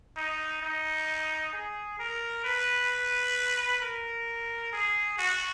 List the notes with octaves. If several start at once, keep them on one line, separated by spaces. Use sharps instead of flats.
D#4
D#4
G#4
A#4
B4
A#4
G#4
F#4